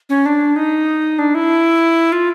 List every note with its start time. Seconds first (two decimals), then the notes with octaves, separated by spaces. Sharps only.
0.09 C#4
0.26 D4
0.56 D#4
1.19 D4
1.35 E4
2.12 F4